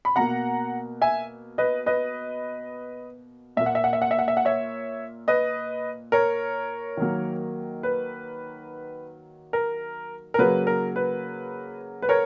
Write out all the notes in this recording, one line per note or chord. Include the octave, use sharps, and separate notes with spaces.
B5
B2 A#3 F#5 A#5
E5 G#5
B4 D#5
B4 D#5
A#2 A#3 E5
F#5
E5
F#5
E5
F#5
E5
F#5
E5
F#5
C#5 E5
B4 D#5
A#4 C#5
D#3 F#3 A#3
B4
A#4
A#4
C#3 F#3 A#3 B4
A#4
B4
B4
A#4 C#5